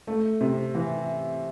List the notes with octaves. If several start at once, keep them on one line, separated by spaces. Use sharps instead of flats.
A3
C3
E3